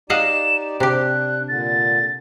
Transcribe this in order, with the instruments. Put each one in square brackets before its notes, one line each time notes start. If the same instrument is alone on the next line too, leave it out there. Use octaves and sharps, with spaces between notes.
[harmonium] D#4 G4 D5 [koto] D#5 F5 F#5 [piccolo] E7
[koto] C3 G4 [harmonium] D4 [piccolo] F#6
[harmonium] A#2 D3 [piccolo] A6